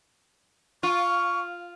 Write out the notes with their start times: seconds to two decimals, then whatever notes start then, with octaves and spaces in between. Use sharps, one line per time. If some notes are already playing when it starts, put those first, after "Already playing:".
0.83 F4 C#6